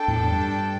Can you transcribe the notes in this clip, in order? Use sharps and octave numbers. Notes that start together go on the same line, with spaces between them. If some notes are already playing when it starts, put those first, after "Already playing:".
Already playing: D4 A4 G5
E2 A2
G2